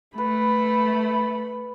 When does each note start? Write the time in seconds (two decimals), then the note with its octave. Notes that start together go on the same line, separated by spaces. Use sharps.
0.18 A3 B4 B5